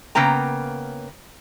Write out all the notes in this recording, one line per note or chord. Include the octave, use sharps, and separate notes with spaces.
C#3 A#3 B3 G5 A#5